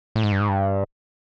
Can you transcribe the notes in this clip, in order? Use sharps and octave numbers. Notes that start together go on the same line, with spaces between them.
A2
G#2
G2
G#2
G2